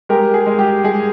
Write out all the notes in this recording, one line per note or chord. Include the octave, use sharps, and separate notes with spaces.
G#3 G4 A#4
G#4
G#3
G4
G#3 G#4